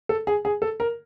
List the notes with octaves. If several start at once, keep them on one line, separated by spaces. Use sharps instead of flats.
A4
G#4
G#4
A4
A#4